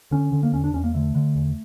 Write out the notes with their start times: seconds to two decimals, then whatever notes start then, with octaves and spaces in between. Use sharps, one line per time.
0.11 D3 C#4
0.32 D3
0.43 A#3
0.53 E2 C#4
0.64 D4
0.73 E2 C#4
0.84 A#3
0.94 D3 A3
1.15 D3
1.35 E2